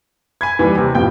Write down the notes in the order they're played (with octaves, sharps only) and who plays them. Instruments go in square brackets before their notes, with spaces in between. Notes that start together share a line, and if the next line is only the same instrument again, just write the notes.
[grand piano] G#5 B5 G#6
[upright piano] D#2 [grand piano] E3 G3
[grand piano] C3
[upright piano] A1 F2 A#2 [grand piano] G5 G6